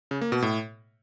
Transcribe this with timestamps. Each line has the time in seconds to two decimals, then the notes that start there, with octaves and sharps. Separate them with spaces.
0.11 C#3
0.21 A#3
0.32 B2
0.42 A2